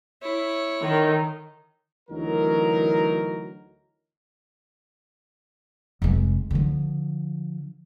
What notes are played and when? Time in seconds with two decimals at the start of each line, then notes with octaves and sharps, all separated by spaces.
0.22 E4 C#5
0.84 D#3
2.10 D2 E3 F#3 D#4 A#4
6.02 F1 G#3
6.51 D3 F3